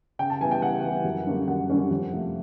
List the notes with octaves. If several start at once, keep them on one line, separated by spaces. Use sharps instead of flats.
C#3 G5
A5
E3 G3 B3 E4 G#5
G5
C#3 F#5
E3 G3 B3 E4
F#2
D3 G3 A#3 C#4
F#2 F#5
D3 G3 A#3 C#4
F2
C3 F3 A3